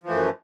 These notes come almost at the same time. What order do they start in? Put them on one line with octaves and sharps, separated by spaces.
F3 E3 A3 F#2